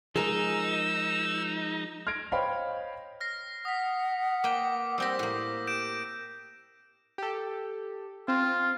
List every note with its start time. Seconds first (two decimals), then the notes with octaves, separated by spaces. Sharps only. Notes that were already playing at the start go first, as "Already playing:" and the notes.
0.16 F3 G#3 D#4 G#4 A#4 E6
2.07 F6 G#6 A#6 D7
2.32 C5 C#5 D#5 F5 G5 B5
3.20 F6 A#6 C7
3.65 F#5 D#6 B6
4.44 A#3 B4 G5 D6
4.98 G3 C4 G4 E6 G6 A#6
5.19 A2 A#3
5.67 G4 G6 D7 E7
7.18 G4 A4
8.28 C4 F4